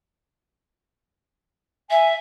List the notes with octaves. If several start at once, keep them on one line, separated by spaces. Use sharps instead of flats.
E5 G#5